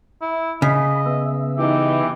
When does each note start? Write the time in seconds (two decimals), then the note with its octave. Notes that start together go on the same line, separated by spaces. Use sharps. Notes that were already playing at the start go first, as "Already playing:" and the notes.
0.22 E4
0.62 C#3 D#5 B5
1.06 B3 E5
1.58 E3 D#4 G4